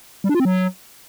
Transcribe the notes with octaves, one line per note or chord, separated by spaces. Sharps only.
G3
D4
F4
C4
F#3